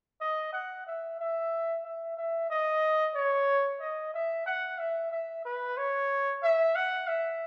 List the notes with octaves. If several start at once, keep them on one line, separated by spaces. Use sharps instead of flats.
D#5
F#5
E5
E5
E5
E5
D#5
C#5
D#5
E5
F#5
E5
E5
B4
C#5
E5
F#5
E5